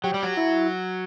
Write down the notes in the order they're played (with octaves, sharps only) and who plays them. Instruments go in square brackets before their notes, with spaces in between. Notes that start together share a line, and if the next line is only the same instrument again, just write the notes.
[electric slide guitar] F#3 [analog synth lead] G4
[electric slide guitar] G3
F#3
[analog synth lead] E4